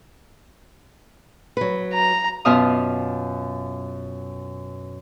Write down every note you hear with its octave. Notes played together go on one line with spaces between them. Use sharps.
F#3 B4
A#5
F#2 B2 F4 D#5 F5 D#6